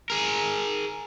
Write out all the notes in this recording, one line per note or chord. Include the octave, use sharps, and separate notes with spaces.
G#4 A#4